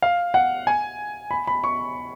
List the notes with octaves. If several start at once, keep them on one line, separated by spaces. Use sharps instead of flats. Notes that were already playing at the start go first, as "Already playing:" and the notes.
F5
F#5
G#5
B5
B5
C#6